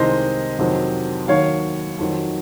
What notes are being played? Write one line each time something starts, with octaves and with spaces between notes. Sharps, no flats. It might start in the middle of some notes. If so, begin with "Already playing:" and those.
Already playing: C2 C3 D#3 G#3 C5 D#5
F2 C3 D#3 F#3
D#2 D#3 F#3 C#5 F5
F2 D#3 F#3